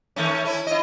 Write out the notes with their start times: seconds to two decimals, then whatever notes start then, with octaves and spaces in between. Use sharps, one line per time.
0.16 D#3 A3 C#4
0.45 C#4 E4
0.67 E4 D#5